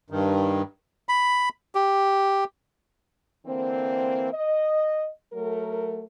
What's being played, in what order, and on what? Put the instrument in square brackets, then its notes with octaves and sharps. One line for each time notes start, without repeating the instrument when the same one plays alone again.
[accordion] G2 D#3
[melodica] B5
G4
[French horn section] D3 E3 A#3 C4
D#5
F#3 A3 A#4